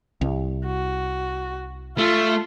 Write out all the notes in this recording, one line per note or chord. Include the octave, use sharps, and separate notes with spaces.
C2
F#4
A3 F4